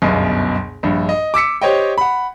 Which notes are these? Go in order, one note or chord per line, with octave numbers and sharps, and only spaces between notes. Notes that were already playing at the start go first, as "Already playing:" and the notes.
G1 C#2 F#2 B2
A#1 G2
D#5
D6 E6 B6 C#7
G4 C5 C#5 D#5 G5
F#5 B5